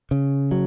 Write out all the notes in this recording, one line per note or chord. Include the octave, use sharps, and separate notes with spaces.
C#3
F#3